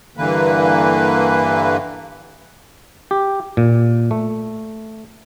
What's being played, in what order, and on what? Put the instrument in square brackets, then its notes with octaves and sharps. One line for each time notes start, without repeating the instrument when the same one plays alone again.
[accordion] G2 D3 E3 A#3 B4
[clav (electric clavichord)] G4
A#2
A3